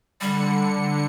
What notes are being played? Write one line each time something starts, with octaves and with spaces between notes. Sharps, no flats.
D3 G3 C#7